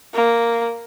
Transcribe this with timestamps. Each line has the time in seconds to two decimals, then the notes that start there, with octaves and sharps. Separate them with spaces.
0.14 A#3